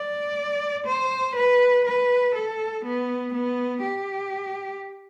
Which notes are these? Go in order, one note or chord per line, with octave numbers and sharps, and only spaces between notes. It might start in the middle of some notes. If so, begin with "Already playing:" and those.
Already playing: D5
C5
B4
B4
A4
B3
B3
G4